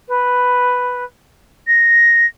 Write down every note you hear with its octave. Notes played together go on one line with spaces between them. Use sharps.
B4
A#6